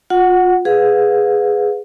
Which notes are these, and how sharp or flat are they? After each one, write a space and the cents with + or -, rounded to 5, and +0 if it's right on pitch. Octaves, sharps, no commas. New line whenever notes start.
F4 +30 F#5 +0
G#4 +0 B4 +10 F5 +45